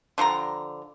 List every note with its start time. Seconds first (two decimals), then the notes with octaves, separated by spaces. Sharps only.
0.18 D3 F3 G3 A#5